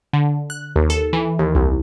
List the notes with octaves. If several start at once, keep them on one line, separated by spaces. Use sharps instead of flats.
D3
F#6
D#2
A4
E3
D#2
C2